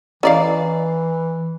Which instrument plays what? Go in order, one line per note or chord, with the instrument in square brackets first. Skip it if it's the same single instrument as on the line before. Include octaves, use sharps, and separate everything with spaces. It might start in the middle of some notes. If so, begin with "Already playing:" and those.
[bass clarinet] E3 [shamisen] C#4 D5 F5 [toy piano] E4 D#5 A#5